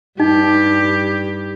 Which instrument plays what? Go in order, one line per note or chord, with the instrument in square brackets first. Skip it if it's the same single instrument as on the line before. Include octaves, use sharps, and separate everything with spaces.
[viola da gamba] G2 G4 [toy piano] D#4